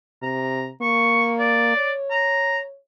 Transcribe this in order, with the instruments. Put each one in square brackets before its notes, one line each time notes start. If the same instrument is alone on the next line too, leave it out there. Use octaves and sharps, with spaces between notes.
[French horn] C3 [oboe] A#5
[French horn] A#3 [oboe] C#6
[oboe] D5
[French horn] C#5
[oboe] A#5